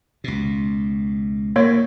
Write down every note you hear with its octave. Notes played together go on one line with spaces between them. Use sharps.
C#2 B2
A2 A#3 C#5